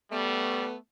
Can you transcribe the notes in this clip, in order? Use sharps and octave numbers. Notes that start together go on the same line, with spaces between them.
G3 A3 B3